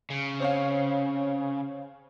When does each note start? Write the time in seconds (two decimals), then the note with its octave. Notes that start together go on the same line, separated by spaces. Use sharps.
0.10 C#3
0.40 C4 C#5 F5